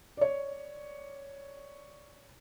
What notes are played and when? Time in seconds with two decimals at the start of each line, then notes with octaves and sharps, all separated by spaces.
0.17 C#5 D5